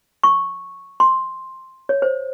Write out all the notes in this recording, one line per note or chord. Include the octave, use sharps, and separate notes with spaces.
C#6
C6
C#5
C5